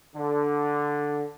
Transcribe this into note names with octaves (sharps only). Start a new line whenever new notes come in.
D3